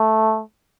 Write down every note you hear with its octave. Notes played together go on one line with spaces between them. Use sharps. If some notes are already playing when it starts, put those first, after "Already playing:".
Already playing: A3